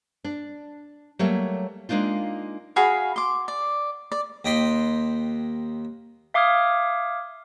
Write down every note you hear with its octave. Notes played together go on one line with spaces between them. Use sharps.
D4
F#3 G3 A3 A#3 C#5 E5
G#3 A#3 D4 D#4 F4
F#4 G#4 F5 B5
C6 D6
D5
D5
D#2 D#5 G5 B5 C6
E5 F5 D6 D#6 F6 G#6